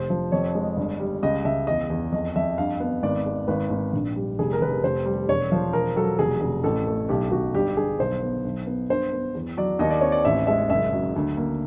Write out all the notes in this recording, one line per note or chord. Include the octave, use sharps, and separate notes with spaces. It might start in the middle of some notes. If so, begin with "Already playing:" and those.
Already playing: F1 C5
F3
F2 C#5
G#3
G1
G3
C#2 D#5
C#2 E5
E2 D#5
E2
F2 D#5
F2 E5
G2 F5
B3
G#1 D5
G#3
G#1 B4
G#1
A#1
G3
F1 G#4
A#4
F1 B4
A#4
F1 C5
G3
E1 C#5
F3 C5
E1 A#4
F#3 A4
F1 G#4
F1
A1 A4
A3
B1 G4
B1 F#4
G1 G4
G1 G#4
B1 C5
B3
B1
B3
G2 C5
B3
E2
F#3 D5
D#2 D#5
D5
C4 C#5
D5
A1 E5
G#3 E5
F#1 E5
F#3
D2
A#3